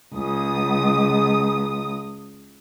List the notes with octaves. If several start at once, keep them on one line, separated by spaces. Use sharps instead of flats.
C#2 D#6